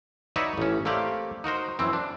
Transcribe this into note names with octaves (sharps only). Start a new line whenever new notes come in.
D#4 F#4 B4 C#5 D5 E5
A1 C#4
A3 A#3 C4 G4 D5
D#4 F#4 A#4 C5
F#2 E3 C4
D4